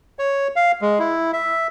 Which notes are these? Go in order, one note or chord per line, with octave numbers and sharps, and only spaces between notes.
C#5
F5
G#3
E4
E5